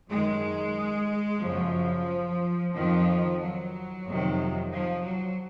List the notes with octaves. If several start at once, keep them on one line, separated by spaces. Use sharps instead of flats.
F#2 D#3 G#3
C#3 F3
F#2
F2 D#3 F3
F#3
F2 C3 D#3
F3
F#3